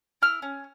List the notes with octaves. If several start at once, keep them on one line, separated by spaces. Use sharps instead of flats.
E4 F6
C#4